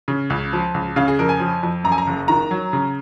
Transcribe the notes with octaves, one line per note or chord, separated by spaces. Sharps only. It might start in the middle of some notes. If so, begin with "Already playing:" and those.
C#3
C#2
F3
C#2
C#3 F5
G#4
F2 A#4
G#5
F3
F2
F#2 A#5
G#5
A#5
F#1
D#3 A#5
F#3
C#3